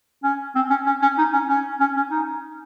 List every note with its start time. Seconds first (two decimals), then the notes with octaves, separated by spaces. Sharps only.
0.23 C#4
0.55 C4
0.70 C#4
0.86 C#4
1.02 C#4
1.18 D#4
1.33 C#4
1.49 C#4
1.80 C#4
1.96 C#4
2.11 D#4